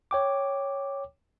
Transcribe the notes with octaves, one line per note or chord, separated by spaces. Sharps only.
C#5 G5 D6